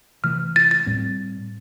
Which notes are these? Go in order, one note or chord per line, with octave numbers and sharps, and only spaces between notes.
C3 E3 A3 F6
A6
A6
A2 G3 C4